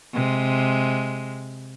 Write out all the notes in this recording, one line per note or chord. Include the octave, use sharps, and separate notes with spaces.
C3 G#3